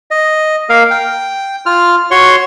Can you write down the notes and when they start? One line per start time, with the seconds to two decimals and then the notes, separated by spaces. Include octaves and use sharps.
0.11 D#5
0.69 A#3 A#4 F5
0.91 G5
1.66 F4 F6
2.11 F#4 C#5 C6 C#6